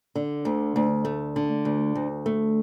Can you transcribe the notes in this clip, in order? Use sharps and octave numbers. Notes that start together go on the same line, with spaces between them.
D3
D2
D2
A3
D3
D2
D2
A3